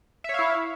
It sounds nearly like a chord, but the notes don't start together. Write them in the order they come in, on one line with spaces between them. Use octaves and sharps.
E5 C#5 F5 E4